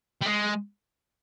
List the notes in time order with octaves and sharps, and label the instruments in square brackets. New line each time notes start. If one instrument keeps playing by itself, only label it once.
[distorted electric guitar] G3
G#3